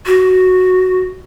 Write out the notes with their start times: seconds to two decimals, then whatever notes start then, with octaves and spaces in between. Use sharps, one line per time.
0.06 F#4